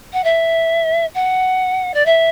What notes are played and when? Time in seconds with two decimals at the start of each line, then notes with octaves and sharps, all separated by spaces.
0.13 F#5
0.24 E5
1.14 F#5
1.94 D5
2.05 E5